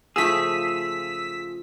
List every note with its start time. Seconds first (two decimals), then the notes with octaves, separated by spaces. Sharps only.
0.16 C#3 F3 A3 F4 G#4 D#6 E6 B6